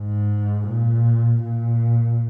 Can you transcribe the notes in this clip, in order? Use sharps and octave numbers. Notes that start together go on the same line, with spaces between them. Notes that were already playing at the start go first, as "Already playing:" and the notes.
Already playing: G#2
A#2
A#2